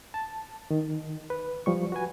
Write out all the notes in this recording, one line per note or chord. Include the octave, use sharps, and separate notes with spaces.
A5
D#3
B4
F3 G3 C#6
F#4 B4 G#5